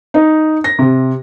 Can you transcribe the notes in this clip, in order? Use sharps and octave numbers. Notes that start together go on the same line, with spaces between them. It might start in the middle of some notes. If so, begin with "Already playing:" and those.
D#4
A#6
C3